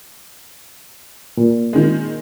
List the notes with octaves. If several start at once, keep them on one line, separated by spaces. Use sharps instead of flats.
A#2
D#3 G#3